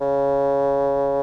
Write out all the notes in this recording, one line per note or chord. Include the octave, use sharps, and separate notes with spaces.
C#3